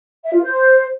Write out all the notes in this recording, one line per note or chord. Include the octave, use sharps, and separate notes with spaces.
E5
F4
C5